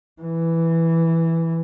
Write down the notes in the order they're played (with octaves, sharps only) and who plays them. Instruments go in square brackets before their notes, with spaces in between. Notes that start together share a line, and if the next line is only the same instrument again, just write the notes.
[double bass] E3